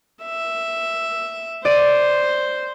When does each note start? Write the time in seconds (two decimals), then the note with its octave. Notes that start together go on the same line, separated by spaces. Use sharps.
0.24 E5
1.65 C5 D5 D#7